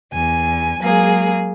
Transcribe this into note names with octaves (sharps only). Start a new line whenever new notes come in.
E2 G#5
F#3 G#3 A#3 G#4